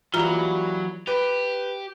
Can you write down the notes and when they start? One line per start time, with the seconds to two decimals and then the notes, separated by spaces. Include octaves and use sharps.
0.14 E3 F#3 G3 A#3 F4 A#5
1.07 G4 B4